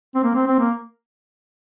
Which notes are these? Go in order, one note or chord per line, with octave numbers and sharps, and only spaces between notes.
C4
A#3
C4
C4
A#3